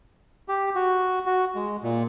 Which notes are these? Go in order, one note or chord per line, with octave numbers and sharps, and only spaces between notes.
G4
F#4
F#4
G#3
A#2